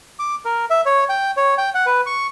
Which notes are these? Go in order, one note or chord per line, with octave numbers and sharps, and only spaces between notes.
D6
A#4
E5
C#5
G5
C#5
G5
F#5
B4
C#6